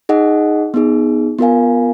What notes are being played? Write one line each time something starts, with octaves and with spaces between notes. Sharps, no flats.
D#4 G#4 D#5 F#5
B3 D#4 G#4
B3 F4 A#4 F5 G#5